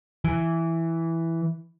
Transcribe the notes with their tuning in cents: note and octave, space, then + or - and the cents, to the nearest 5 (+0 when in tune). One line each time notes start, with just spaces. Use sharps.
E3 +0